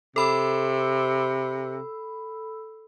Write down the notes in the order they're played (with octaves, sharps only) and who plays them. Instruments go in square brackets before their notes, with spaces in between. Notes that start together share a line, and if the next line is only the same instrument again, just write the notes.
[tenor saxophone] C3 [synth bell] A4 B5 E6